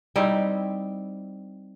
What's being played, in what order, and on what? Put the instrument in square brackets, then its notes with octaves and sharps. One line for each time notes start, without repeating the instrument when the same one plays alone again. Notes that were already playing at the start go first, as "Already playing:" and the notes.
[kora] G3 C4 D#4 E4